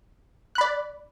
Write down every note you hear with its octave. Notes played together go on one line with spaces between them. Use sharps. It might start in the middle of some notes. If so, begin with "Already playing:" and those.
D5 B5 F#6